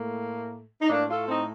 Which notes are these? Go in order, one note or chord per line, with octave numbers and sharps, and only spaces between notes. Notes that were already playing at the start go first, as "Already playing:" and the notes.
Already playing: A2 A3 A#3
D#4
A2 A3 A#3 D4
F4 A4
C4 D#4